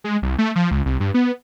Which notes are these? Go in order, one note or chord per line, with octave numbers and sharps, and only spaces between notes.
G#3
C2
A3
F3
C#2
C2
G2
B3